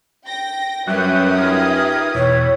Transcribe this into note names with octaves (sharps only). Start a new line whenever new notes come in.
G5 A#6
F#2 F#3 G3 F#4 G4 B4 E5 D#6
D#4 F4 G#4
E2 B2 C#5